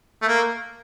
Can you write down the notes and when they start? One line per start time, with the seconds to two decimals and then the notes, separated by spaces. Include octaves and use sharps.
0.22 A3
0.28 A#3